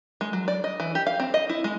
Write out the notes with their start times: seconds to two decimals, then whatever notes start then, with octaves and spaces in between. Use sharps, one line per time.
0.21 G#3
0.33 F#3
0.48 D5
0.64 D#5
0.80 E3
0.95 G4
1.07 F5
1.20 C4
1.34 D#5
1.49 E4
1.64 G#3